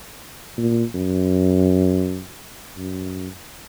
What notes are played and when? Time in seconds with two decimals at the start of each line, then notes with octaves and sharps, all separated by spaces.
0.58 A#2
0.95 F#2
2.77 F#2